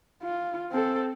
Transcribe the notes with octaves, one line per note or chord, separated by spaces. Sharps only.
F4
C4 A4